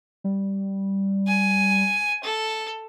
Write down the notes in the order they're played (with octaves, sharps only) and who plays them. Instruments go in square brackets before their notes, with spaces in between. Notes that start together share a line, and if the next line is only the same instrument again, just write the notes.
[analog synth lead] G3
[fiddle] G#5
A4